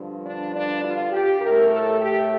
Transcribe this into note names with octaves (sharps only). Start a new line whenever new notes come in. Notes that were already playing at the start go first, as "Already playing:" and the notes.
Already playing: G2 D3 F3
D4
D4
F4
G4
A2 A#4
A3
A4
G4